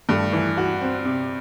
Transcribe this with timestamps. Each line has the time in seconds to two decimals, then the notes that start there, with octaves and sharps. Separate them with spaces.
0.09 G2 A3
0.33 E3
0.57 F#4
0.81 C4
1.05 C3